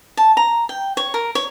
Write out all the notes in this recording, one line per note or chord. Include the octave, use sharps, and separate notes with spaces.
A5
A#5
G5
C#5
A#4
C#5